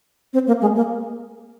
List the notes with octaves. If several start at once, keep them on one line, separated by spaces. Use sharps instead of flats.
C4
A#3
G#3
A#3